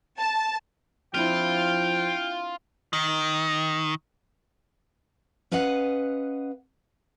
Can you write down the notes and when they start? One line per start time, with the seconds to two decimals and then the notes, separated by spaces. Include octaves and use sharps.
0.19 A5
1.14 F3 C4 D4 E4 F4 G5
2.93 D#3
5.51 C#4 B4 D#5 F5 F#5